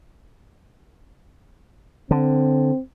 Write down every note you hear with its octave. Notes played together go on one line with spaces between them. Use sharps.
D3 C4